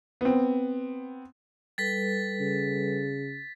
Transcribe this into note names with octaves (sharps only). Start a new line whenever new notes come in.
B3 C4
G3 A4 B4 A6 B6
C#3